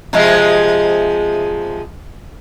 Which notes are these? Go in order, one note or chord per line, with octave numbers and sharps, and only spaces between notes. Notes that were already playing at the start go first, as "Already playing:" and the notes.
C3 F3 G#3